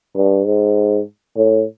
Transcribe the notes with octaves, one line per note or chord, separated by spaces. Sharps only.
G2
G#2
A2